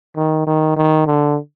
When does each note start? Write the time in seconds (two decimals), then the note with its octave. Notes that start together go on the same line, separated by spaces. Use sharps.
0.17 D#3
0.47 D#3
0.77 D#3
1.07 D3